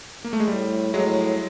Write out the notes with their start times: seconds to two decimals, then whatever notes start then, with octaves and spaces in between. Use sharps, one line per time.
0.24 A#3
0.33 A3
0.40 G#3
0.48 A2 G3
0.94 A2 F#3 G#3